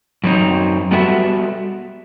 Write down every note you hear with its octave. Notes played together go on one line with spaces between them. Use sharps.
F#2 F#3 C4 D#4
G3 B3 F#4 A4 E5